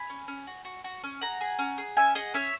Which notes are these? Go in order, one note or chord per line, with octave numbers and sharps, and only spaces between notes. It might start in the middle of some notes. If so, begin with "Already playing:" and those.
Already playing: G#5 B5
C#4
C#4
F#4
F#4
F#4
C#4
G#4 F#5 A#5
G#4
C#4
G#4
C#4 E5 G#5
G#4 D#5 F#5
C#4 C#5 E5